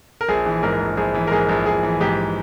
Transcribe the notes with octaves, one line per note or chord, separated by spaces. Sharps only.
A#4
A#1 G#4
E3
G#2 A#4
A#1
A#1 G#4
E3
A#4
G#2 G#4
A#1
A#1 G#4
E3
G#2 G4